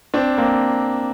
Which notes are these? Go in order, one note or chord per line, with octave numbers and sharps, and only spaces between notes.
C4 D4
A#3 C4